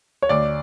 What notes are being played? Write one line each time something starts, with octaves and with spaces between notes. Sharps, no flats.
C#5
D2 D5